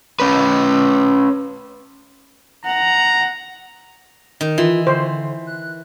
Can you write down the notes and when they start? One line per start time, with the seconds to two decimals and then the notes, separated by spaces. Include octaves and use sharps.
0.20 C#4 B4
2.65 F#5 A#5
4.41 D#3
4.58 E3 F4
4.87 D3 C5
5.47 F#6